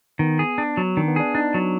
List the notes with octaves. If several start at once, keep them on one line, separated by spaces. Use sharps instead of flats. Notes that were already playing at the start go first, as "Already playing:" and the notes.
D#3 B3
G#4
D4
F#3
D#3 D4
B3
D4 G#4
D4 D#4
F#3